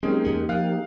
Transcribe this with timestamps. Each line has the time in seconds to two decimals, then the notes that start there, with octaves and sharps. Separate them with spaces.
0.03 F#3 G#3 A#3 C4 C#4 D#4 G4 G#4
0.24 E2 B3
0.49 F3 F5 F#6